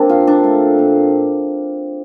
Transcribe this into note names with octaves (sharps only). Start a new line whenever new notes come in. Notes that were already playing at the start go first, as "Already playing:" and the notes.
Already playing: A#3 C4 D4
A#2 F4
D4
A3
A#2